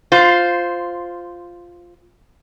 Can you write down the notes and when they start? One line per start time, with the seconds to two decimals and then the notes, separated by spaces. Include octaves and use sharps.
0.12 F4 C5